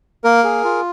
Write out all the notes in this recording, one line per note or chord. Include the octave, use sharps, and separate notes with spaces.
A#3 A#4
G#4
F4